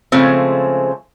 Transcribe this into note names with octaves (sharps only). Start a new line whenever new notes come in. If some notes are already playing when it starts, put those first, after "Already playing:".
C#3 F3 G#3 A3 C4